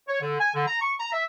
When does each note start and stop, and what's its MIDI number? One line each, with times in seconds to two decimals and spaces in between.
0.08 0.20 73
0.21 0.35 50
0.40 0.50 80
0.55 0.67 50
0.67 0.79 82
0.82 0.93 85
1.00 1.09 82
1.12 1.23 76